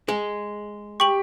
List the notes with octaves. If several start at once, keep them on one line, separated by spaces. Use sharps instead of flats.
G#3
G4 C#6 F#7